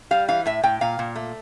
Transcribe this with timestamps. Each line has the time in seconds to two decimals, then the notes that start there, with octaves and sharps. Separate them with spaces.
0.11 G3 F5
0.28 E3 F5
0.46 A2 E5
0.63 A2 G5
0.81 A#2 F5
0.99 A#2
1.16 A3